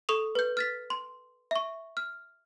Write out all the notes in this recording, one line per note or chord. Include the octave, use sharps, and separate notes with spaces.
A4 C#6 D#6 F7
B4 G6
F6 A6 B6
C6
E5 C#6
F6